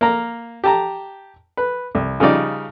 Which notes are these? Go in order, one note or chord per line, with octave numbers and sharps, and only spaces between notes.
A#3 A#5
G4 A5 A#5
B4
C2
C#3 F3 G3 D#4 D5